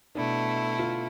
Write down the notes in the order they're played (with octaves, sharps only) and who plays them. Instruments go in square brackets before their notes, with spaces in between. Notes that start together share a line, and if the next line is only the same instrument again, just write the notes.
[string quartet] B2 A3 E4 [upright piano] D4
[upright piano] F4